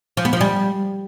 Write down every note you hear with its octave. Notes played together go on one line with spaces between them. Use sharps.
F3
B3
F3
G3